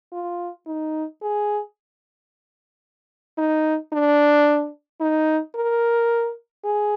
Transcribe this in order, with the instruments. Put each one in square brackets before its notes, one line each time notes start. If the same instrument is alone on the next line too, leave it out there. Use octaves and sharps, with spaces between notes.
[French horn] F4
D#4
G#4
D#4
D4
D#4
A#4
G#4